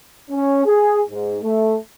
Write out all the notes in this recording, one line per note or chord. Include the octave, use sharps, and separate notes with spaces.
C#4
G#4
G#2
A3